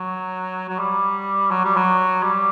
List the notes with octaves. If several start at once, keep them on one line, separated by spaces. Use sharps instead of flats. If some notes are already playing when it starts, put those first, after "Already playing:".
Already playing: F#3
F#3
G3
F#3
G3
F#3
G3